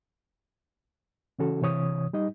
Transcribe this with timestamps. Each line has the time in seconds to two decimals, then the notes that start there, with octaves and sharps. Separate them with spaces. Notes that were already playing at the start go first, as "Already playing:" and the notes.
1.39 C#3 E3 C#4 F#4 A4
1.62 C3 E3 C#5 D#6
2.13 G3 D#4 D#5